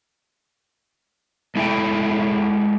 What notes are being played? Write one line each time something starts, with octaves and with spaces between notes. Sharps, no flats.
G#3 E4 G#4 A4 G5